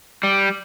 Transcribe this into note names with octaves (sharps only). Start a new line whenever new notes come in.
G3